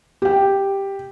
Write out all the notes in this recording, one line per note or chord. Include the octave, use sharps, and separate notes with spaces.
G4 G5